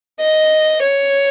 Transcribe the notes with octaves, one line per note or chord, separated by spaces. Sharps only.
D#5
C#5